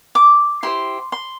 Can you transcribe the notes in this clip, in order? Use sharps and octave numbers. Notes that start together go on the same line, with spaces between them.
D6
E4 G4 C5 C6
C6